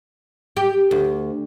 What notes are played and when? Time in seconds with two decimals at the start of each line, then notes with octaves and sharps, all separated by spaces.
0.57 G4
0.91 D2